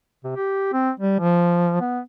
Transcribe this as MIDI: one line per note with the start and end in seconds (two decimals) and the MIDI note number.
0.24 0.33 48
0.36 0.68 67
0.73 0.91 60
1.00 1.17 55
1.20 1.80 53
1.81 2.00 59